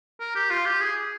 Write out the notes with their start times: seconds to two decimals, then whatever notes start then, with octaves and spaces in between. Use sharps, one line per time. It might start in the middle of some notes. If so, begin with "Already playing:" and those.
0.20 A#4
0.35 G4
0.50 F4
0.66 G4
0.81 G#4